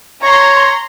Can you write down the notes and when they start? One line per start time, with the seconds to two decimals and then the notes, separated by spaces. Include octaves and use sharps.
0.22 C#5 A#5 C6